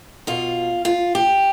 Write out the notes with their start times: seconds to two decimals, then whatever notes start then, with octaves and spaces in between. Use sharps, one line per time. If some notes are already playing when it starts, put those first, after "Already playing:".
0.27 B2 F4
0.85 F4
1.15 G4